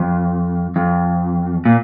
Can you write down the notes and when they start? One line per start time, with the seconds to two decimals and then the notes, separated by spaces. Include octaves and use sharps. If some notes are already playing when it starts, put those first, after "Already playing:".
Already playing: F2
0.76 F2
1.65 A#2